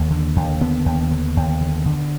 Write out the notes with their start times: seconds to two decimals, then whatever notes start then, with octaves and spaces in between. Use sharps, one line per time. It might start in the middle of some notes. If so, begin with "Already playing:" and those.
Already playing: D#2 A#3
0.11 D3
0.36 D#2
0.61 D3 B3
0.86 D#2
1.11 D3
1.37 D#2
1.61 D3
1.86 D3